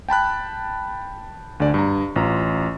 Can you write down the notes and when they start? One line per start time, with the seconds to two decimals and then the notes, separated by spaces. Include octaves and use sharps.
0.09 G5 A5 B5 F#6
1.60 D2 D3 D5
1.74 G2 A#5
2.16 A1 F4 A#5